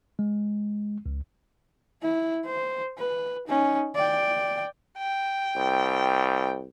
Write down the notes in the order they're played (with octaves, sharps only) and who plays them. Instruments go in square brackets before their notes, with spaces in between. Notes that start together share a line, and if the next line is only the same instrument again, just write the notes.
[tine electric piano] G#3
C#2
[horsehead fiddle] E4
C5
B4
C#4 D#4
D5 G5
[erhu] G5
[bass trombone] C2